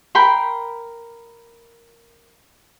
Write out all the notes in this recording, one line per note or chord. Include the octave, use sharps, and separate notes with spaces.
A#4 G5 B5 C6